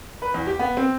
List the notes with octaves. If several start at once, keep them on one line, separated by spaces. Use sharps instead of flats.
B4
E2
G4
B3
C4